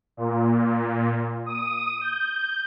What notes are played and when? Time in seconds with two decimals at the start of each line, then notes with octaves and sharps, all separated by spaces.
0.17 A#2
1.46 D#6
2.01 G6